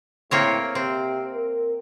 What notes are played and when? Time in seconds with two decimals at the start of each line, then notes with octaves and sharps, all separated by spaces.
0.31 A2 A#3 C4 C#5
0.75 C3 C4
1.35 A#4